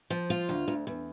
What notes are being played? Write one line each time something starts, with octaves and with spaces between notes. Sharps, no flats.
F3
F4
D2
D2
E2